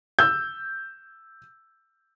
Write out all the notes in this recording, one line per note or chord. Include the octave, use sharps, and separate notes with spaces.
E6 G6